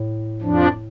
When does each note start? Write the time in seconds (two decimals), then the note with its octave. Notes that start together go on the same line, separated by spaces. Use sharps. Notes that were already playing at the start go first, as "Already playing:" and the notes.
Already playing: A2
0.41 F2 F3 D4